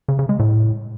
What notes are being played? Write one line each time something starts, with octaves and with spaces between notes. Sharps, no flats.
C#3
C#3
G#3
A2